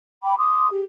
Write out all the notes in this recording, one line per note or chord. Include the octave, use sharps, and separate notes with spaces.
G5 B5 D6
C6 D6 D#6
G4 G#4